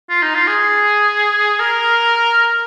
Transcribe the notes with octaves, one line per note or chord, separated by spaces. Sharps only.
F4
D#4
F4
G#4
A#4